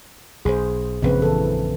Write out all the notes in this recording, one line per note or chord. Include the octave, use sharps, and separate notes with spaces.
B1 G#4 C5
A#1 F#2 C#3 C4 B4
E3 A4